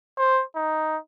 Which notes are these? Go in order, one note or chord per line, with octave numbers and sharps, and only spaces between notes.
C5
D#4